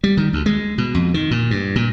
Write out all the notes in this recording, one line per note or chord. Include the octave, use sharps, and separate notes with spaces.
G3
D#3
D2
G#3
B2
F2
D#3
A#2
G2
A#2